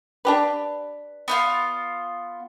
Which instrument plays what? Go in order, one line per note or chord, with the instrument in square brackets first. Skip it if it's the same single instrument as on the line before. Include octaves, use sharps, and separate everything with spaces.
[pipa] D4 G4 B4
[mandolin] B3 D#4 F4